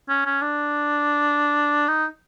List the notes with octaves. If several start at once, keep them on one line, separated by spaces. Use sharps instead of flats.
C#4
C#4
D4
D#4